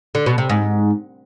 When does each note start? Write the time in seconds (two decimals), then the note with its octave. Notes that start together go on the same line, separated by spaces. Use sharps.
0.15 D3
0.26 B2
0.38 C3
0.49 G#2